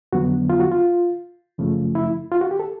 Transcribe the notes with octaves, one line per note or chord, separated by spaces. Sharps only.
F2 D3 F#3 B3 F#4
F4
F#4
F4
F#2 C#3 F3 A3
E4
F4
F#4
G4
A4